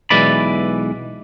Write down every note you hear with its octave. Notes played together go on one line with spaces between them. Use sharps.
B1 E3 G#3 B4 D5 B5